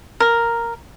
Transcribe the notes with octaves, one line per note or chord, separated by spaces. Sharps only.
A#4